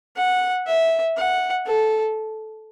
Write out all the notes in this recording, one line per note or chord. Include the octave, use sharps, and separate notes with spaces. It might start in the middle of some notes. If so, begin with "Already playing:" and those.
F#5
E5
F#5
A4